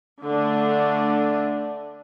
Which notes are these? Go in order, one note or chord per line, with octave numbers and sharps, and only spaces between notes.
D3 A3 D4